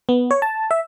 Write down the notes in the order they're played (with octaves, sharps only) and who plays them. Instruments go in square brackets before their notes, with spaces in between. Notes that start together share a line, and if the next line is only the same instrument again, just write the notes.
[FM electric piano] B3
C#5
A5
E5